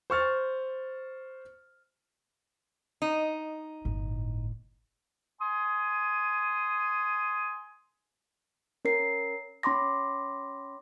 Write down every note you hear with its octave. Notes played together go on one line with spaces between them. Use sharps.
C5 C#6 F6 A6
D#4
G1 A2
G#5 C6 D#6
C#4 A#4 C7
C#4 B5 C6 D6 A#6